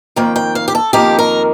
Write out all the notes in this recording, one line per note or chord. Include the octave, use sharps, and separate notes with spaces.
F2 D#3 A#3 G5
G5
F5
G4
A4
F2 D#3 A#3 G4
A#4